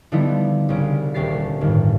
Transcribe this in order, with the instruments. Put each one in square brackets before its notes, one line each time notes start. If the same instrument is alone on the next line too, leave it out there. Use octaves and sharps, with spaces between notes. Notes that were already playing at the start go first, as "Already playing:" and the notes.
[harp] D3 F3 G3 B3 D#4 E4
C2 C#3 D7
D#1 D2 C#4 G4 A6 C7
G1 A2 D#3